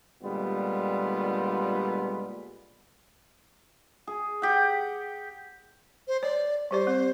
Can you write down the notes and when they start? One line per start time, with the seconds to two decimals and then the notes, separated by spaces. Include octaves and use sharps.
0.22 A#2 D3 G3 G#3 B3 F4
4.07 G#4
4.42 G4 F#5
6.08 C5
6.23 C#5 D5
6.71 G3 G4 C5 D5
6.87 C4